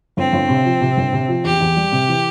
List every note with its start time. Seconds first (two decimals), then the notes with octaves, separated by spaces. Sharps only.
0.17 G1 C4
0.33 G1
0.49 C3
0.65 F3
0.81 C3
0.97 G1
1.13 C3
1.28 F3
1.44 E2 G4
1.61 E2
1.76 G3
1.92 C3
2.08 E3